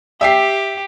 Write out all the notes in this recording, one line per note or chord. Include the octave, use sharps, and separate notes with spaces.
G4 E5 G5 C7